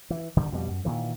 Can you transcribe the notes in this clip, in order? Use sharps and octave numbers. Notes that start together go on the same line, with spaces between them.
E3
G1 D3 D#3 G3
F2 B2 F3 G3
F#2
A#2 D#3 E3